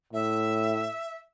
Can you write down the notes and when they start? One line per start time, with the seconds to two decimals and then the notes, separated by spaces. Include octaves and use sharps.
0.13 A2 E5